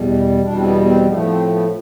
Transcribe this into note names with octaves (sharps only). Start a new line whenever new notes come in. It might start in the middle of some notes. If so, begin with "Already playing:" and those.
Already playing: E2 B2 G3
E2 B2 G3 D4
C4
B3
C4
A2 F3 A3 B3
B3
C4
B3